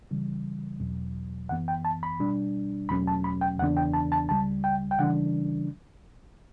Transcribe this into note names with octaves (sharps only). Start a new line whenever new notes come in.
C#3 E3 G3
E2 B2 F#3
F#2 E3 B3 F#5
G5
A5
B5
B2 G3 D4
E2 B2 F#3 A3 C#4 B5
A5
B5
G5
E2 C#3 E3 B3 D4 F#5
G5
A5
A5
C#2 C#3 G3 A5
G5
G5
C#3 E3 G3 D4 F#5